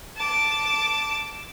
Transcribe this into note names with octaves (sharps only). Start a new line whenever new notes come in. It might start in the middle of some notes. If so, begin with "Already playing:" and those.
A5 D6